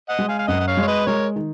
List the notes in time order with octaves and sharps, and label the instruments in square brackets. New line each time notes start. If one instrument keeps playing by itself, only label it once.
[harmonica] D#5 F#5
[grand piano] G#3
[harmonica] F5 G#5
F5
[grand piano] F#2 [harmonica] D#5 F#5
[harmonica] F#5
C#5 F5
[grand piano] G#3 [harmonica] C#5
[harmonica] B4 D#5
[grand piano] G#3 [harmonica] A#4 C#5
[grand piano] D#3